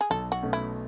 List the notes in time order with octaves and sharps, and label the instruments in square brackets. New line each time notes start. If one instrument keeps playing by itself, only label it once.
[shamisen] G#4
[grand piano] B1 [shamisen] A4
[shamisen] F#4
[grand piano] B2 A3 C#4
[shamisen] E4